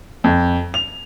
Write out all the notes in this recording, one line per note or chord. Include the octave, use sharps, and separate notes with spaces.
F2
F7